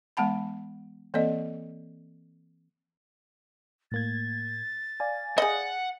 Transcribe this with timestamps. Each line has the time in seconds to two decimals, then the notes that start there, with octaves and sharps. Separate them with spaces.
0.17 E3 G#3 B3 F#5 A5 B5
1.14 E3 A#3 C4 A4 D5 D#5
3.92 A2 A#3 G#6 A6
5.00 D5 F5 G#5
5.38 G#4 D#5 F#5